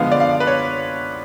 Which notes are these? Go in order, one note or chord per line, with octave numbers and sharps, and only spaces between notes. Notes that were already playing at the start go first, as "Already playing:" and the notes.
Already playing: D3 F3 G#3 B3 F5
D5
F5
B4
C#5